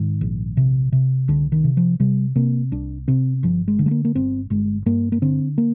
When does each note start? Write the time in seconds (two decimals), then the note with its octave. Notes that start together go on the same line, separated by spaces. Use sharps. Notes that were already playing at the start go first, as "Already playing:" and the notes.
Already playing: G#2 D#3
0.21 A#1
0.57 C3
0.92 C3
1.28 C2 D3
1.52 D#3
1.64 C3
1.77 F3
2.00 C3 G3
2.35 C3 A#3
2.72 C2 D4
3.08 C3 C4
3.43 G1 F3
3.68 G#3
3.79 D3
3.86 G#3
3.91 A#3
4.05 A#3
4.15 G1 C4
4.50 G1 G#3
4.86 G2 A#3
5.12 A#3
5.22 D3 C4
5.58 A#3